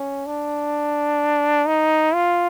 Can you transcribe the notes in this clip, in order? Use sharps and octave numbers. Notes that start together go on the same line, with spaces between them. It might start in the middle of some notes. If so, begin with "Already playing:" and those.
Already playing: C#4
D4
D#4
F4